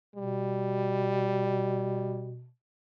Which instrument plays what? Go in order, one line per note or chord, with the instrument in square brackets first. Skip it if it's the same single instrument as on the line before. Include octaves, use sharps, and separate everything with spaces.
[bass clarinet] B2 [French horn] G3